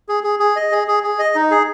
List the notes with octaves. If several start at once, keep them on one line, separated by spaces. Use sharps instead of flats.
G#4
G#4
G#4
D#5
G#4
G#4
G#4
D#5
D#4
G#4